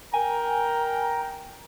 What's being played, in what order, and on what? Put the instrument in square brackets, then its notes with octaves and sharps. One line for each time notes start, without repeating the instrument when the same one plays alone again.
[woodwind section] A#4 G5 A#5 [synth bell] G#5